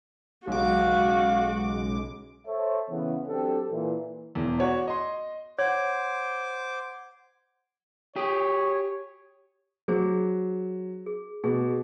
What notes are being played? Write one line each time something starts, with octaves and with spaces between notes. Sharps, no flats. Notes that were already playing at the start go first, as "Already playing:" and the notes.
B1 C#3 G#3 F#4 F5 D6
A4 C5 C#5 E5
C#3 E3 B3
F#3 C4 D4 G4 A4
A#2 E3
E1 E2
F#4 C#5 D5
D#5 C6
C5 C#5 F#5 D6 G#6
G4 G#4 C#5
F#3 D4 G#4 C5
G#4
B2 G#4